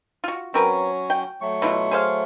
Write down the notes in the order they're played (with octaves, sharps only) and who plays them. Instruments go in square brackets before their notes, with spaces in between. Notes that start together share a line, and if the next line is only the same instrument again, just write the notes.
[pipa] F4 F#4
[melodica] F#3 C#4 F#4 [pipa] C4 A#4 B4
[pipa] G5
[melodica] F#3 A3 C#6
[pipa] B2 E4 F4
G#4 C5 F5